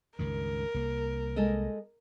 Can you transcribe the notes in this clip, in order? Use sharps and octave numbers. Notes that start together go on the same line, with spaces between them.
C#2 G2 D#3 A#4
C2 A#3
G#3 A4 D#5